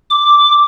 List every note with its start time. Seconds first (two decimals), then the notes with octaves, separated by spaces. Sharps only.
0.10 D6